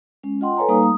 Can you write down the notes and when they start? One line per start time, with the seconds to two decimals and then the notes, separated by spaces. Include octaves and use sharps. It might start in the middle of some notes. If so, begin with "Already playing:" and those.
0.23 G#3 C#4
0.41 F4 D#5 F#5 G5 C6
0.57 A4 B4 C#5 G#5 A#5
0.69 G3 A#3 D#4 F5 A#5 D#6
0.83 A3 D#6